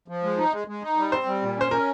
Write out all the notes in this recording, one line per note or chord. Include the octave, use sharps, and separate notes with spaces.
F3
G#3
D#4
G#3
G#3
D#4
G3
C4 C5
G3
A#2
C#4 C5
C#4 A#4